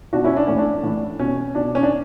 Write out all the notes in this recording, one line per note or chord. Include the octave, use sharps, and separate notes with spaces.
B2 D4 F#4
C#4 E4
D4
A2 E3 C#4
D4
A2 E3
B2 C#4
B2 D4
C#4
D4